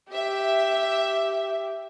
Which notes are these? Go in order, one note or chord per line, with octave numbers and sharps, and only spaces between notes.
G4 E5